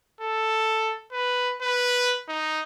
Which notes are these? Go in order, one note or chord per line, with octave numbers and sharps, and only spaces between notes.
A4
B4
B4
D#4